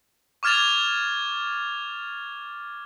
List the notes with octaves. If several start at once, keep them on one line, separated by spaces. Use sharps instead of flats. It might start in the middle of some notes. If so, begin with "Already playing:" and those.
C#6 D6 F6 G#6 A6 F7